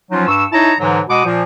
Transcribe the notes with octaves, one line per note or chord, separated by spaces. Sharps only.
F3 F#3 C#4 D#4 F4
G2 C#6 E6
D#4 E4 C#5 A5 A#5
G#2 D3 E3 F#3
B2 G#3 F#5 D6 D#6
A#2 F3